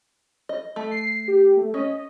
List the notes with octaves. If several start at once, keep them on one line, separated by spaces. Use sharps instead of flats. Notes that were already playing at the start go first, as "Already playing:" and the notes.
D#5
A3
C7
G4
A3
C#4 D#5